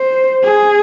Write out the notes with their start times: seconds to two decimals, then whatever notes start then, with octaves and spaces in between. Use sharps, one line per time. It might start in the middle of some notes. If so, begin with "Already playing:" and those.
Already playing: C5
0.43 G#4